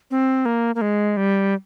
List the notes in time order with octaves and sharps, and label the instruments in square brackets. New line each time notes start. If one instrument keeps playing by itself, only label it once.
[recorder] C4
A#3
A#3
G#3
G3